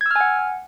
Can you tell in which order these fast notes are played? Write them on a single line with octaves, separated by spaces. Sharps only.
G#6 E6 F6 G#5 F#5